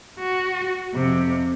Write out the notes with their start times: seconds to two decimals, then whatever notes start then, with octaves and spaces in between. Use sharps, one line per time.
0.20 F#4
0.95 F2 C3